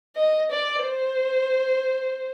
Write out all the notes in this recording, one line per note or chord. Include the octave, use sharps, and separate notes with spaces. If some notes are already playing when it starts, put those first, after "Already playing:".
D#5
D5
C5